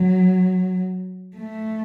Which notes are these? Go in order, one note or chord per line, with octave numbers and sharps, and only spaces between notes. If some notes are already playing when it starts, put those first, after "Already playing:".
Already playing: F#3
A3